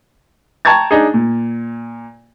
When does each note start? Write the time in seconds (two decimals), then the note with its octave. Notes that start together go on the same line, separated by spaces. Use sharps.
0.65 G5 A5 A#5 C#6 G#6 A6
0.91 D4 D#4 G#4
1.14 A#2